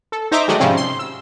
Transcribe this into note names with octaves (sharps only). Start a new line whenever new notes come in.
A4
D#4 C5 D#5 E5 A#5 D6
D#3 F#3 G#3 A3 D5 D#5
G#2 C3 F3 G3 C4 C#4
C6
E6